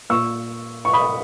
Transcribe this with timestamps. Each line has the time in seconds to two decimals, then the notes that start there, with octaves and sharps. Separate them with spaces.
0.10 A#2 C#6 E6
0.85 C#6
0.93 B5 D#6